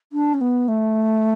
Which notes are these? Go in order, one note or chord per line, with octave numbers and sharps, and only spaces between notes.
D4
C#4
B3
A3